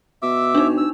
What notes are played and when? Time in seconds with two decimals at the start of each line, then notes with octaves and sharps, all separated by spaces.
0.22 B2 E5 D6 E6
0.55 D4 D#4
0.77 E6